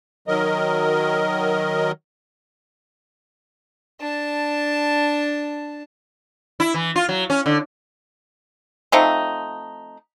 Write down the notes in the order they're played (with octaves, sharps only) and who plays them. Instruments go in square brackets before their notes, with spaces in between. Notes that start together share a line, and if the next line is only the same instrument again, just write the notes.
[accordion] D#3 F#3 A#4 D#5
[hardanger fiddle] D4 A5
[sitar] E4
E3
F4
F#3
C#4
D3
[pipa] F3 A3 C4 D#4